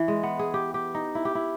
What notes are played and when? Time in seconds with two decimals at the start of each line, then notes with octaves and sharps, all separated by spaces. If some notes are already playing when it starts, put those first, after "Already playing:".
Already playing: E3
0.08 G#3
0.23 B3
0.39 G#4
0.54 G4
0.74 G4
0.94 D#4
1.15 E4
1.25 G4
1.35 E4